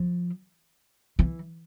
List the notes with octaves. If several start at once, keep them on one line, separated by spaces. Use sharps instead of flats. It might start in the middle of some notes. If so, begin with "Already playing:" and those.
Already playing: F3
E3